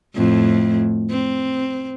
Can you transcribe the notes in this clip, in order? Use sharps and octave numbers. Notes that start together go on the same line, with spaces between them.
F2 A2
C4